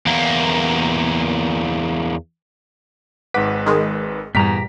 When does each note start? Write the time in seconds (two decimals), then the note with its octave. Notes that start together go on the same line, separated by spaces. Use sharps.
0.07 E2 A#3
3.34 G#1 G#2 B4 F#5 D6 B6
3.66 D#3 G#3
4.35 E2 G2 A#2 G3 G4 A#5 B6